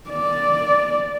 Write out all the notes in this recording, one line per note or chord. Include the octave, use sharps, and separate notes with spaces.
D5